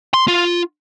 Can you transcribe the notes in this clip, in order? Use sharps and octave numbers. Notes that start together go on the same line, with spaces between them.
C6
F4